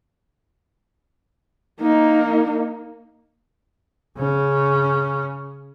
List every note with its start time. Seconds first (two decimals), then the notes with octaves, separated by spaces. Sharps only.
1.82 A#3 D#4
4.18 C#3 C#4